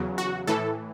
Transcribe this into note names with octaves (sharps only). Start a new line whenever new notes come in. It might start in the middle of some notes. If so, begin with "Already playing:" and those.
Already playing: E2 C#3 F#3
F#4
A2 E3 A4